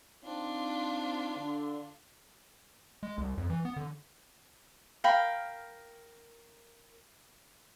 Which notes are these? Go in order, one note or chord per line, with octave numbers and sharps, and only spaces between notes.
C4 D4 D#4 F4
D3
G#3
C2
F2
E3
B3
D3
A#4 F5 G5 B5